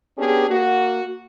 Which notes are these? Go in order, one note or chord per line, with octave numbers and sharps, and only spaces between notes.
B3 C#4 D4 G4 G#4
A#3 F#4